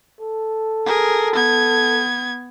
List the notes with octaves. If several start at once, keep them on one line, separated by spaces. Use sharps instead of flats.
A4
G#4 A#4
B3 G#6